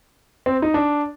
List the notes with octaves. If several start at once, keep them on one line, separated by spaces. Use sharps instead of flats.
C4
D#4
D4